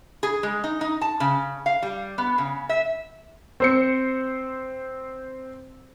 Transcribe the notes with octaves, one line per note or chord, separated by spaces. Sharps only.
G#4
G#3
D#4
D#4
A5
C#3
F5
G3
B3
C#3
E5
C4 C5 C#7